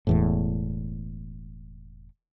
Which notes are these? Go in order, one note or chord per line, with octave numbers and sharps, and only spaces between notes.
E1 E2 A2